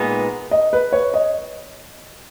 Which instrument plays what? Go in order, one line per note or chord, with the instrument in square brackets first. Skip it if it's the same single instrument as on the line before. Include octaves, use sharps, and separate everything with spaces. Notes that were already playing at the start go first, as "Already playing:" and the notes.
Already playing: [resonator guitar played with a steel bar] A#2 G#3 B3 D#4
[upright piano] D#5
B4
C#5
D#5